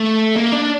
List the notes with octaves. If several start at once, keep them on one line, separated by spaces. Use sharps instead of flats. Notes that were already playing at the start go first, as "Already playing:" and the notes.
Already playing: A3
A#3
D4